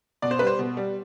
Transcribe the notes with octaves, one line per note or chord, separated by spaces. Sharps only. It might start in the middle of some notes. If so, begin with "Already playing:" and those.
B2 D5
C5
G3 B4
C5
B2
G3